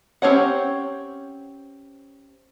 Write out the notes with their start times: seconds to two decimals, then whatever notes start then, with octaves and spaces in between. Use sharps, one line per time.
0.22 C4 C#4 G4 C#5 F#5